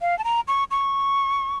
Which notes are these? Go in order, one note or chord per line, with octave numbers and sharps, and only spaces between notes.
F5
A5
A#5
C#6
C#6